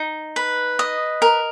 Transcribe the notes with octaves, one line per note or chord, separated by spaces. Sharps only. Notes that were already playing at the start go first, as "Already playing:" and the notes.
Already playing: D#4
B4
D#5
A#4